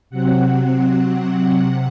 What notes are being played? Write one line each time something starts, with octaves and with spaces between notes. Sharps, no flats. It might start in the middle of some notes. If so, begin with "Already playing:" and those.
C3 F#3 C4 F#5
C3 F#5